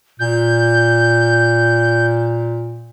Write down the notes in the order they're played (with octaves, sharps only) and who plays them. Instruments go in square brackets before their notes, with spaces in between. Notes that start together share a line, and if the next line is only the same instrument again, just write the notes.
[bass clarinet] A#2 [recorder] G6